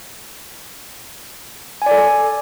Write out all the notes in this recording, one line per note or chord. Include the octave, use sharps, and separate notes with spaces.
A4 D5 G#5